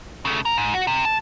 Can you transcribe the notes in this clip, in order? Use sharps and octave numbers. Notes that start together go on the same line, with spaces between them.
C#3 A3
A#4
G#2
F#4
C3
A5